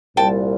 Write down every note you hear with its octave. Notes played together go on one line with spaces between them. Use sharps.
C2 A#2 G3 G5 A5